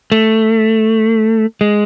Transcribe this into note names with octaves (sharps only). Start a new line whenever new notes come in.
A3
G#3